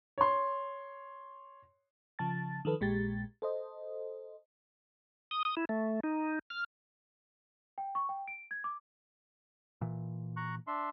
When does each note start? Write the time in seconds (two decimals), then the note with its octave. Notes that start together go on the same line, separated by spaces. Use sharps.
0.18 C#5 C6
2.19 C#3 F3 A5 A6
2.65 D#3 F3 A4 B4
2.81 A#1 A#2 G#3 G4 A6
3.42 A4 C5 D#5
5.31 D#6
5.45 D#6
5.57 E4
5.69 A3
6.03 D#4
6.50 F6
7.78 G5
7.95 C#6
8.09 G5
8.28 D7
8.51 G#6
8.64 D6
9.81 A#2 E3
10.37 A#5 C#6 F#6
10.67 D4 E5 C6